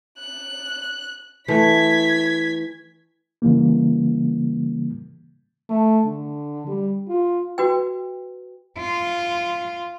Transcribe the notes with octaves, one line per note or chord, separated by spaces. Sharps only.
F#6
E3 A3 G#6 B6
C#3 E3 G3 A#3
A3
D3
G3
F4
F#4 B4 G5
F4